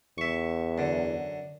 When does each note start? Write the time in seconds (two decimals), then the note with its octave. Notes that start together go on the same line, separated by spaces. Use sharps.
0.18 E2 E5 C#6
0.78 F#2 D3